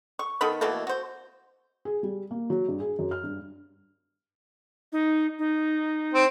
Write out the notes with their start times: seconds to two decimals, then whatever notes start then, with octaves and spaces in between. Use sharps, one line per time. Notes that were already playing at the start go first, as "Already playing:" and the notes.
0.19 C#6
0.41 D#3 B3 A4 B5
0.61 B2 E3 A3 A#3
0.87 F#4 C5
1.85 G#4
2.03 G3
2.31 A#3
2.50 F#3
2.68 G2
2.80 G#4
2.99 F#2
3.11 F6
3.23 G2
4.92 D#4
5.39 D#4
6.14 C4